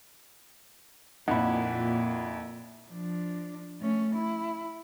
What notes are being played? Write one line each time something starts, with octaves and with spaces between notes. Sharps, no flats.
F2 A#2 D#4 E4 F#5 B5
F3 D4
A3 C#4
E4